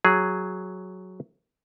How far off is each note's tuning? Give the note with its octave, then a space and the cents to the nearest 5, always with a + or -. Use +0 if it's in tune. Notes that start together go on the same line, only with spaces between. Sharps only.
F#3 +0 G#4 +0